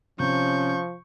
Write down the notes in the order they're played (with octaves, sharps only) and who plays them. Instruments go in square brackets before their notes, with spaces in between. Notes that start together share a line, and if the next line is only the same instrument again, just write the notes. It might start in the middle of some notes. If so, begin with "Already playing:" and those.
[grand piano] C3 [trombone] F3 [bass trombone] C#4 [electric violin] C#6 G6